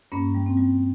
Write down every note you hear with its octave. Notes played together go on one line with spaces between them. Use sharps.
G2 A#3 C#4
G3
C4
G3